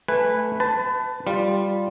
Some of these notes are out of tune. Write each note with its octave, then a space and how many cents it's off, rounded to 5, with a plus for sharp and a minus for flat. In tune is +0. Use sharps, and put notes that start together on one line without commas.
A3 -5 B4 +0 G#5 -20
B4 +30 A5 +0
G3 +0 F4 +0